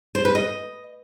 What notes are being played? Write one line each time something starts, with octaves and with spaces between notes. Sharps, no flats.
C5
B4
D#5